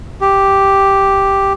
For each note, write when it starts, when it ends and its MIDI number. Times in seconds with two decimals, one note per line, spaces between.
0.21 1.53 67